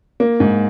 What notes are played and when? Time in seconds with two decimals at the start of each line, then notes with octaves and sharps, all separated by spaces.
0.20 A#3
0.40 G#2